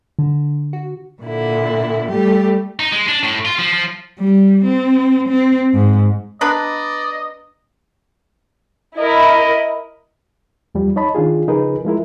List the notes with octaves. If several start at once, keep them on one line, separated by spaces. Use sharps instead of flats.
D3
F#4
A#2 D3 E4
G3 A3 G4
D#4
G#3
D4
A2
F4
F3
F3
G3
C4
C4
G#2
B3 D4 B4 D5 D#5 A#5
E4 A#4 D#5
E2 F3 G3
D#4 C#5 D#5 A5 B5
D#3 D4 F4 G#4
C#3 F3 D#4 G#4 A#4 B4
F3 G#3 E4 A#4